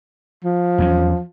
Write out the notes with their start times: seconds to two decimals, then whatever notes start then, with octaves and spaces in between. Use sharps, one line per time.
0.44 F3
0.78 E2 F#3 C#4